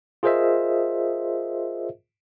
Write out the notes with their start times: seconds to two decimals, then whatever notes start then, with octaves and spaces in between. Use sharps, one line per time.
0.23 F4 G#4 A#4 C5 D#5 E5